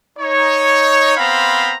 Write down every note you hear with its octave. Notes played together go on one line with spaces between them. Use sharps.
D#4 C#5
B3 C4 C5 F5 A#5 B5